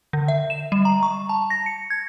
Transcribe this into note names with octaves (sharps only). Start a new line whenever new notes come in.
D3
E5
E7
G3
A#5
C#6
A5
A#6
C#7
G#6